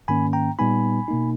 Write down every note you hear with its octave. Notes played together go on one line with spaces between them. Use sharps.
G#2 D#3 A#3 C#4 G#5 B5
G5 A#5
A#2 G3 B3 D#4 G#5 B5
B2 A#3 D#4